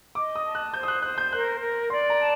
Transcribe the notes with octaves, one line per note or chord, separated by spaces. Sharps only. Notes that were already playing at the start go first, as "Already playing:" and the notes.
D#5 D6
D#6
A5
F#6
C5 G6
D#6
F#6
C5 F#6
G6
A#4 F#6
A#4
D5 C6
A#5
A5